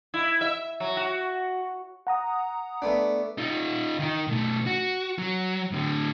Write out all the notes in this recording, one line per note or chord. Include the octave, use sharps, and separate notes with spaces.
E4
E5
F#3
F#4
F#5 A#5 D#6
A3 B3 D4
D#4 F4
D#3 D#4
B1 A3
F#4
F#3
A2 D3